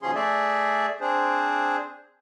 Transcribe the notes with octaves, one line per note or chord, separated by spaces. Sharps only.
D#2 B2 F3 C#4 G#4 C6
A3 G#4 D5 E5
C4 D4 G#4 C5